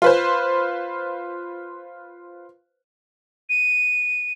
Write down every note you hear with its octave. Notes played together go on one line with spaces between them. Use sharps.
F4 B4 C5
D#7